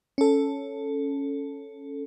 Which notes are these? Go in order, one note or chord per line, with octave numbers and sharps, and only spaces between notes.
C#4 A4